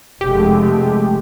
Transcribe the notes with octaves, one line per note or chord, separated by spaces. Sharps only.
F1 G#3 A3 G4